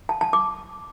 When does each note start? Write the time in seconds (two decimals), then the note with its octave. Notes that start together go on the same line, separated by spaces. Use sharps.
0.09 A5
0.21 A5
0.33 D6